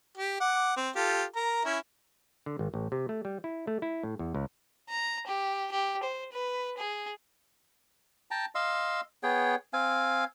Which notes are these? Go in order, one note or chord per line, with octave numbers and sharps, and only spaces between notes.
G4
F#5 D6
C4
F4 G4 A4
A#4 A#5
C#4 E4
D3
G#1
A1
C3
A3
G3
E4
A3
E4
A2
E2
C#2
A#5
G4
G4
C5
B4
G#4
G5 A5 A#5
D#5 F5 C6 E6
B3 G#4 C#5 G5
C4 F5 G#5